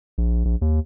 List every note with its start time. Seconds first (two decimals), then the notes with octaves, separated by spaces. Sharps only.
0.18 A#1
0.45 A#1
0.61 D#2